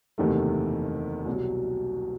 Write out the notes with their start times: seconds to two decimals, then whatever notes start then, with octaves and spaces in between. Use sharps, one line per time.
0.18 F#1 E2 C3 D#3 A3
1.26 C2 B2 F#3